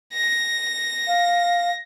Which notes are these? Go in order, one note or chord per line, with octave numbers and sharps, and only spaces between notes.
A#6
F5